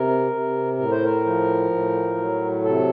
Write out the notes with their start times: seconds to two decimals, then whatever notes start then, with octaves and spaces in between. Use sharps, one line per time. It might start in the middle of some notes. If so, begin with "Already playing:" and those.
Already playing: C3 A#4
0.32 C3
0.78 A2 A#4
0.91 C5
1.04 A#4
1.25 F3
1.71 A2
2.18 F#3
2.64 C3 A4